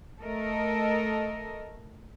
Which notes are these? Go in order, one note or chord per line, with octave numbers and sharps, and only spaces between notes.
A3 A4 A#4 D#5